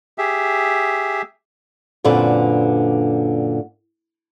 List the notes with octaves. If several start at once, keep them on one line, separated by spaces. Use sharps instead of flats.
G4 G#4 E5
F#2 A#2 D3 C4 B4